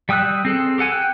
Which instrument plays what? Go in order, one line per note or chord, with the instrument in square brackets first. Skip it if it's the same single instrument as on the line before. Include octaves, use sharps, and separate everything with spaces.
[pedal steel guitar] G3 G5 D#6 E6 F#6
C4 G#4 A4
G4 A4 F#5 G#5
G5 F#6